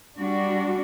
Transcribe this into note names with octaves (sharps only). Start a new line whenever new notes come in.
G3 D4 F#4